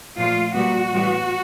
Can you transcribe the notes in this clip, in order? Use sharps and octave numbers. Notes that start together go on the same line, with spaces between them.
A#2 F3 A3 F4
A#2 G3 B3 F#4
A2 E3 G3 B3